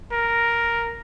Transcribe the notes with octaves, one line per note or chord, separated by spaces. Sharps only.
A#4